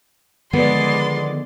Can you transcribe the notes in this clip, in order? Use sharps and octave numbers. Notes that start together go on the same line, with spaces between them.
D3 D#3 F3 G#3 B3 D5 C6